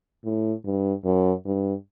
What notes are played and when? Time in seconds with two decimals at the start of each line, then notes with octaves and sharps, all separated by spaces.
0.25 A2
0.65 G2
1.04 F#2
1.45 G2